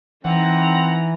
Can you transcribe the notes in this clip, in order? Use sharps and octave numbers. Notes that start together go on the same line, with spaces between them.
E3 C4 D#4 F#5 A#5